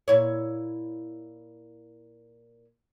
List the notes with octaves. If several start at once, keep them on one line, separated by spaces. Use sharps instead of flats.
A#2 E4 C#5